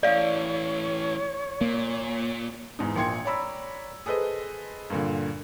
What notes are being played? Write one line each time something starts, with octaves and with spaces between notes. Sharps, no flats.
A2 E3 C#5 D5 F5
A#2 A#3
E2 G#2 D#4
A#1 A#2 G5 C6 G#6 C#7
C#5 D5 A#5 B5 E6
G#4 A4 B4 C5 D#5
G2 A#2 D3